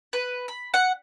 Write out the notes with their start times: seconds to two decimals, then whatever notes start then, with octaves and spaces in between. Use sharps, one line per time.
0.13 B4
0.48 B5
0.74 F#5